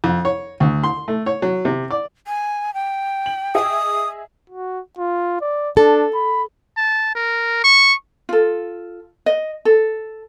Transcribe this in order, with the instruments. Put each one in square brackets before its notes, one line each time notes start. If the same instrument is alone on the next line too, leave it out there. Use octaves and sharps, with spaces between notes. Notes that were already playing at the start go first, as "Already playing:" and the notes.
[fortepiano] F2
C#5
D2
C6
A3
C#5
F#3
C3
D5
[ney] G#5
G5
[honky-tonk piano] F#7
[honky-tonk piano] G#4 D#5 E5 [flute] D#6
[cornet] F#4
F4
D5
[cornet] D4 [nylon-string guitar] A4
[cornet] B5
[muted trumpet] A5
A#4
C#6
[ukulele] F4 A4
D#5
A4